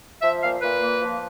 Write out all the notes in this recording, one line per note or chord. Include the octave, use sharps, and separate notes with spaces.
F3 E5
A#2 F5
A#2 B4
A#3
F3